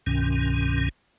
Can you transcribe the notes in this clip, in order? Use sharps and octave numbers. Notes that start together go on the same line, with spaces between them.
C2 G2 B2 D#3 C#4